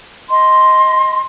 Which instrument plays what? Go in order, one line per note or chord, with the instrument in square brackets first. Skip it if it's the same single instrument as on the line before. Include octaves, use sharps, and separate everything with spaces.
[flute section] D#5 C6